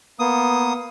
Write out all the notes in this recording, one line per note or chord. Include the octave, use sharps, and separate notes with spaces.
A#3 B3 D#6